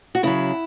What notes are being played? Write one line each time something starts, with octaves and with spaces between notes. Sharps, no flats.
F#4
C#3 F#3 E4